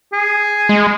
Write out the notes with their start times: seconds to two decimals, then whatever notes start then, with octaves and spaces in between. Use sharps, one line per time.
0.13 G#4
0.69 G#3